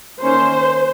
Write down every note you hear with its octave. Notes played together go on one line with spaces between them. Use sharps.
D#3 A#3 C#4 C5